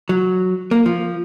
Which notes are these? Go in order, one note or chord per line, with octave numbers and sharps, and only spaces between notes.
F#3
A#3
F3